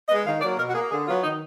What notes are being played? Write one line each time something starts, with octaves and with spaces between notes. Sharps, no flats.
G#3 B3 D#5
D#3 F5
F#3 A#3 D5
B2 A#4
F#4
A#3 G#4
D3 G#4
F#3 B3 F4
D#3 D#4